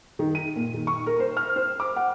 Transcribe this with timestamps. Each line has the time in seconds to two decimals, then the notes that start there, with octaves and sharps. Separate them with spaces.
0.19 D#3
0.35 D#7
0.56 A#2
0.74 D#3
0.87 C#6
1.06 A#4
1.20 C5
1.37 F6
1.56 C5
1.80 D6
1.96 F#5